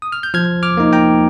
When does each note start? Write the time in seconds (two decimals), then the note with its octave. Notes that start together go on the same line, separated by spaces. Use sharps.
0.02 D#6
0.12 F6
0.23 G6
0.34 F3 F6 G#6
0.63 D6 F6
0.77 A#3 D#4
0.93 G5 A#5